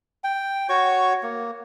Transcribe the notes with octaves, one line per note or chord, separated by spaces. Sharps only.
G5
F#4 C#5 C#6
A#3